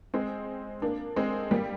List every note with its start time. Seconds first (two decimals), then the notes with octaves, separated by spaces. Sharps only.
0.14 G#3 C4
0.82 A#3 D4
1.16 G#3 C4
1.51 G3 A#3